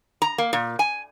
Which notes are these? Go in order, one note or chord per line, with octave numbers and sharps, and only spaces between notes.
A#5
A#3
A#2
G#5